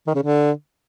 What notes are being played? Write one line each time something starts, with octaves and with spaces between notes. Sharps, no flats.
D#3
C#3
D3